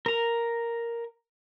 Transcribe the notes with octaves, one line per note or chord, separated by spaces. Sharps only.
A#4 A#5